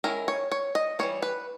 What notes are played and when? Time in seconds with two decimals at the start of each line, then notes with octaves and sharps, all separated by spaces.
0.04 D#3 G#3 C#4 E4 A#4
0.28 C#5
0.52 C#5
0.75 D#5
0.99 E3 G3 A#3 C#5
1.22 B4